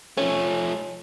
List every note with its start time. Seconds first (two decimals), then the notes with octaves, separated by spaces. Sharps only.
0.17 F3 A3 C#4